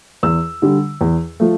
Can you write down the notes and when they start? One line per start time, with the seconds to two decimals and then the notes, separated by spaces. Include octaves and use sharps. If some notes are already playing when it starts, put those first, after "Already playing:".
0.23 E2 E6
0.62 D3 G3
1.01 E2
1.40 F3 A3